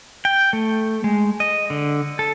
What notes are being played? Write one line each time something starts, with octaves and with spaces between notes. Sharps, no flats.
G5
A3
G#3
D#5
D3
A4